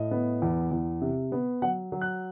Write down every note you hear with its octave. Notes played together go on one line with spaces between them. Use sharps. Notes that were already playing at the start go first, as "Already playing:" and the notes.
Already playing: A2 D#5
B3
E2
E2
C3
B3
F#3 F#5
F#3
F#6